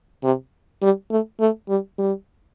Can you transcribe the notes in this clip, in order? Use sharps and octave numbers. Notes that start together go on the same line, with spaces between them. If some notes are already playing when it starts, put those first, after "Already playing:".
C3
G3
A3
A3
G3
G3